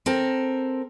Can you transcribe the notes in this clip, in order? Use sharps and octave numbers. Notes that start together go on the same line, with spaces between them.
C4 A4 A#4 A5